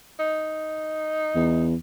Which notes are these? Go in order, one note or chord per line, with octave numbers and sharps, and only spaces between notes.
D#4
E2